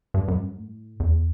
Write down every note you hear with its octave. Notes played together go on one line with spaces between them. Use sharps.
G2
F#2
G2
A2
E2